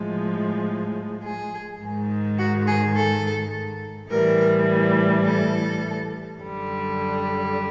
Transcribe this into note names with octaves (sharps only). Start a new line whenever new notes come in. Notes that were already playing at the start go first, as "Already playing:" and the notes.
Already playing: A2 F3 G#3
G#4
G#2 D#3 G#3
F#4
G#4
A4
A2 E3 G3 A#4
A4
F#2 D3 G3